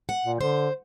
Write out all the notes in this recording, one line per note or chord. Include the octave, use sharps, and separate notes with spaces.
F#5
A#2
D3 C5